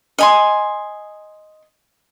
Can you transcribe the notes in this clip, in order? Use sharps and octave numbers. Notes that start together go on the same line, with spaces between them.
D#5 G#5 C6